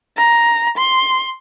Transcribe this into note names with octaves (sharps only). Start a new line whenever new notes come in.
A#5
C6